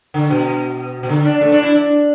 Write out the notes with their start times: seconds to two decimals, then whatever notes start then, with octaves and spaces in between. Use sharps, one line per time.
0.14 D3
0.30 B2
1.03 B2
1.09 D3
1.25 D4
1.41 A3
1.52 D4
1.62 E4
1.73 D4